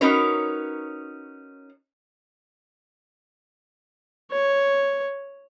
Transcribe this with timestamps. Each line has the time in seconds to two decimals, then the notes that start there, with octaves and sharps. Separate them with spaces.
0.01 C#4 D#4 F#4 A#4 B4 C#5
4.32 C#5